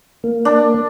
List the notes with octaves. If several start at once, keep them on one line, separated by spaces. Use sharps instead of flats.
A#3
D4